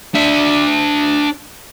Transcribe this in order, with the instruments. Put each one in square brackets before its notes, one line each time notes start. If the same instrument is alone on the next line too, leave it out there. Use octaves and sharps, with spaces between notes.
[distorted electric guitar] D4 E5